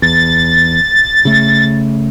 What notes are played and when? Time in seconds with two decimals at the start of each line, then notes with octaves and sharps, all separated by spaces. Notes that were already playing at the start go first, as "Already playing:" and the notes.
0.02 E2 A6
1.25 C#3 A3